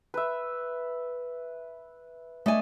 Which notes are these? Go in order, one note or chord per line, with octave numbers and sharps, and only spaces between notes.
B4 E5
A3 D4 D#5 G#5